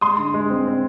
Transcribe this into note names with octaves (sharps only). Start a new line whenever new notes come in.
G#3 C6 D#6
D3
G#3
C4
C4